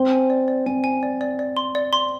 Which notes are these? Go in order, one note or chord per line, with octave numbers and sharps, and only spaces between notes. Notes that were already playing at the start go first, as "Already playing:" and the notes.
Already playing: C4 C6
G#5
D5
D5
C4 G#5
G#5
D5
D5
D5
C6
D5
C6